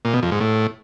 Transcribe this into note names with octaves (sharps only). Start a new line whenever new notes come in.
A#2
B2
F2
G#2
A2